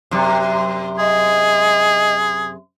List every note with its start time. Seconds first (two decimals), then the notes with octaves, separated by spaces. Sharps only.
0.11 F#2 C3
0.99 G#4 D#5